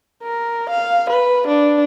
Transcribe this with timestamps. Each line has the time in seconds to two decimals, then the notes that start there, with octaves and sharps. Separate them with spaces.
0.23 A#4
0.69 F5
1.10 B4
1.48 D4